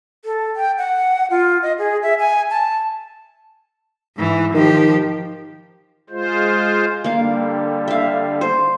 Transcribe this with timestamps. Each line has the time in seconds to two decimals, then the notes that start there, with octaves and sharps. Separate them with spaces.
0.25 A4
0.56 G5
0.78 F#5
1.31 F4
1.63 D#5
1.79 G#4
2.03 E5
2.19 G#5
2.50 A5
4.17 G#2 E3
4.54 D#3 F3 G4
6.10 G#3 F4 C5
7.04 D3 G3 A#3 F5
7.88 E5 F5
8.41 C5